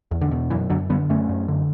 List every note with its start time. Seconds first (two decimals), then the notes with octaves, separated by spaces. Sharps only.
0.11 E2
0.21 D3
0.31 B2
0.50 F#2 E3
0.70 F#2 D3 F#3
0.90 D3 G3 B3
1.09 F#2 A3 C#4
1.29 F#2
1.48 D3